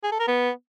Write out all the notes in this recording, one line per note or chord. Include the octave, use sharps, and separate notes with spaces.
G#4
A4
A#4
B3